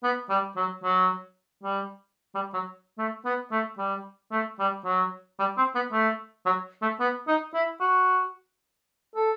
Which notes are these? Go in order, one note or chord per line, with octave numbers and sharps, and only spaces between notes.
B3
G3
F#3
F#3
G3
G3
F#3
A3
B3
A3
G3
A3
G3
F#3
G3
C4
B3
A3
F#3
A3
B3
D#4
E4
F#4
A4